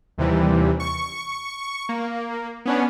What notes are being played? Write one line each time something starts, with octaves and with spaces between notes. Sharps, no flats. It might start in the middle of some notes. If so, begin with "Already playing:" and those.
D#2 C3 E3 G3
C#6
A#3
B3 C#4 D4